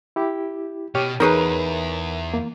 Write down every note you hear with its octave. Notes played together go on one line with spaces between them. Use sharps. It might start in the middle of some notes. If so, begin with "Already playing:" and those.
E4 G4
B2 G4 C#5 F6
E2 D#4 G#4 A#4 B4 C#5
A#3